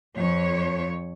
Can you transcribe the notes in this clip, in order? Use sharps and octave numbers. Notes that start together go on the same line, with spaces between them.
F2 C#5